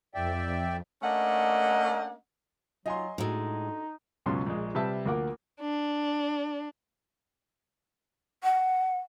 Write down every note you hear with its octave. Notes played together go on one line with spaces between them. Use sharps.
F2 D5 E5 G5
A3 A#3 C#4 D4 D#5 F#5
F#3 D#4 F4 D#5 G#5 C6
A2 G#3 D4 D#4 F#4 A4
C#2 F#2 B2 C#4 C6
A#1 G#3
C3 G3 B4 E5 A5 E6
D2 F3 A#3 A#4 F#5 D6
D4
F#5